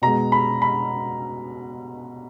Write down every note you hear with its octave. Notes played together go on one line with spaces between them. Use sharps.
B2 G#3 A#5
B5
B5